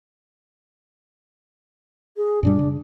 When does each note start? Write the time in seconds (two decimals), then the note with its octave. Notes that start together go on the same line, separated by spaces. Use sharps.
2.16 G#4
2.43 F#2 A#2 G3 D4
2.59 C#3